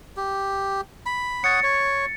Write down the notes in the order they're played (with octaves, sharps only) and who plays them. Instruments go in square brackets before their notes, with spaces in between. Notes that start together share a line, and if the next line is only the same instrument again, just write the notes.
[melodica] G4
B5
[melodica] C#5 F#5 D#6 [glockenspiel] A6 C#7
[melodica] C#5